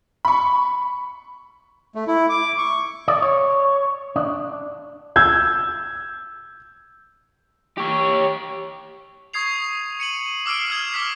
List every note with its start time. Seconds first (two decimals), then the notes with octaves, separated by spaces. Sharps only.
0.25 B5 C#6
1.95 A3
2.07 E4
2.29 D6
2.58 C#6
3.08 D5
3.22 C#5
4.16 D4
5.16 E6 G6 G#6
7.78 G4 C#5
9.34 C#6 D#6 G#6 C7 F7
10.00 C#7 D#7 F#7
10.46 D6 E6 F6 C7 D7
10.68 D#6 F6 G#6
10.92 D6 F6 B6 C7